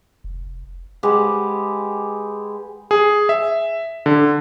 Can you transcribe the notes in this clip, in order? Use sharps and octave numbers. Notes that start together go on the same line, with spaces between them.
F1
G#3 G4 B4 F#5
G#4
E5
D3